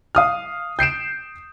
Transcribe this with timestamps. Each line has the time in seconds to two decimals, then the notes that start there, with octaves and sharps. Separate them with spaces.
0.15 F5 D#6 F6
0.79 G6 C7 D7 E7